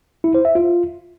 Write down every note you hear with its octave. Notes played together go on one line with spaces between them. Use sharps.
E4
C5
E5
F4